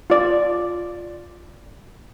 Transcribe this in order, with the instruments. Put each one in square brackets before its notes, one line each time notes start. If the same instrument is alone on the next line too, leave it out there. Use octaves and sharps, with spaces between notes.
[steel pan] F4 D5